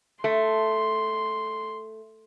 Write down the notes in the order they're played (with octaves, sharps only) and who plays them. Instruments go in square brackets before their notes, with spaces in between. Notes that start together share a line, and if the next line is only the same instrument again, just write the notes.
[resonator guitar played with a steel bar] A3 [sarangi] C6